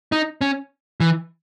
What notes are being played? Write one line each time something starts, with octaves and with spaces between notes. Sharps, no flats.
D#4
C#4
E3